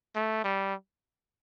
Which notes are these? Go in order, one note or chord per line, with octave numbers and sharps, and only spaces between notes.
A3
G3